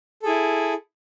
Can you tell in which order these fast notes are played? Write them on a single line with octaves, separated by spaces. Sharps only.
A4 G#4 E4